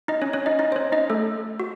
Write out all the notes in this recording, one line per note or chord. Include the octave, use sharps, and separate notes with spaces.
D#4 D#5
C#4 C#5
C#4 C#5
D#4 D#5
D#4 D#5
C5
C#4 C#5
D#4 D#5
A3 A4
F#4